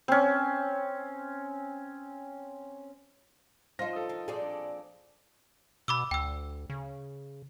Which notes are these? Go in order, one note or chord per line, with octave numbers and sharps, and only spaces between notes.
C4 C#4
F3 D#4 F4 C5 A#6
A4 D#6
D#3
A#2 C4 G#4 D5 G#5 A5
D4
B2 B5 D6 E6
D2 G5 E6
C#3